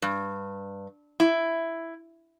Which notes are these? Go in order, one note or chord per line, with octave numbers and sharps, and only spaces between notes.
G2
E4